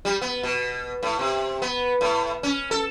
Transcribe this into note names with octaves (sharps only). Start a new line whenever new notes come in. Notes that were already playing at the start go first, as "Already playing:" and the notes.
G3
B3
B2
A2
C3
B3
A2
C#4
A4